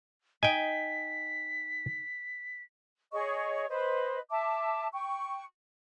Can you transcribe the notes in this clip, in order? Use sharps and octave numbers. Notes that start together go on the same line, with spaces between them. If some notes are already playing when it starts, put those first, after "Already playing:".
D#4 D#5 G5 G#5 B6
G#4 C#5 D#5 C#6
B4 C5 D#5
E5 A5 D6
G5 C#6